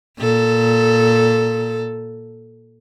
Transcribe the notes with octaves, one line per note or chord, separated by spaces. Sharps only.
A#2 A4